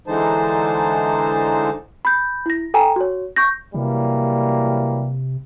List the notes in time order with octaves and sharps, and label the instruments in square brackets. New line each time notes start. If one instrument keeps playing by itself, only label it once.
[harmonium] D3 E3 G#3 D#4 C5 A5
[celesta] B5 G6
E4 A#6
A4 G5 G#5 A#5
F#4 C#5
C#6 G6 A#6
[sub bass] C3 [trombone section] E3 F#3 G3 [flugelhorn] A#3